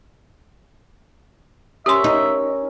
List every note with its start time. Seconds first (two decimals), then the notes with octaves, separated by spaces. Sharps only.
1.86 C#4 G4 A#4 E5 C6
2.04 D#4